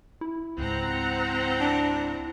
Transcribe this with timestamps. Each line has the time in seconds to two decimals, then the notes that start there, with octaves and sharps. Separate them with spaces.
0.21 E4
0.58 C#2 G#2 C4 F#5 A#5
1.61 D4